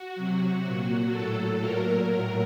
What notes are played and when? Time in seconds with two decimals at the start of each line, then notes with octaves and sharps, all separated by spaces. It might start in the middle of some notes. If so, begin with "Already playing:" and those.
Already playing: F#4
0.16 C3 F#3
0.64 A#2 F#3
1.12 A2 F#3 A4
1.60 A#2 F#3 A#4
2.09 A2 F#3